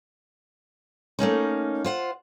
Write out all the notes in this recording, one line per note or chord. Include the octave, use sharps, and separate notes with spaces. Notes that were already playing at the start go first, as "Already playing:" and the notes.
A3 A#3 C#4 D#4
F4 C5 F#5